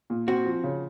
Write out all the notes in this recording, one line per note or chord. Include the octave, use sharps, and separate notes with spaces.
A#2
C4 F#4
F3
C#3